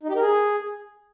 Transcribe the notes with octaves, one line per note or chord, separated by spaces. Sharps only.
D#4
G4
A#4
G#4